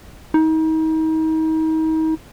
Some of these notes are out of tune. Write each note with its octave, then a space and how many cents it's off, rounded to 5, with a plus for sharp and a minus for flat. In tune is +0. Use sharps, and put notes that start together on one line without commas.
D#4 +35